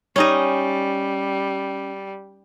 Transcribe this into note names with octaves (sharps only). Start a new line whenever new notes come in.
G3 C#4 D#4 D#5